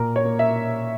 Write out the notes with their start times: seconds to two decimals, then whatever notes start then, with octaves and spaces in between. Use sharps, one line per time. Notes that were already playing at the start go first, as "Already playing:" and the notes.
Already playing: A#2 A#4
0.16 C#5
0.25 A#3
0.39 E5